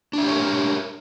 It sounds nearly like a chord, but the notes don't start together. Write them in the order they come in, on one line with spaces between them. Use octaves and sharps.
D4 E5 G4 C#5 A#4